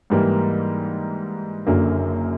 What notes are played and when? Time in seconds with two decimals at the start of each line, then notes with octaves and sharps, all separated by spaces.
0.10 G#2 E3 G3 A#3
1.66 F#1 F#2 D3 F#3 A#3